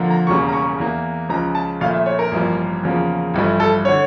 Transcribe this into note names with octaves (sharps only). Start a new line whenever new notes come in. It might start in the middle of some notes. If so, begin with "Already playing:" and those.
Already playing: F2 D3 F3 A#3
A#5
E1 E2 C#3 G3 A#3 C#6
A#5
C#6
E2 E3 A#3
C#2 C#3 F3 A#5
A5
A#1 A#2 A3 F5
E5
C#5
A#4
A1 G2 F3 A#3
E2 C#3 F3 A#3
A1 G2 F3 A3
A4
D3 C#5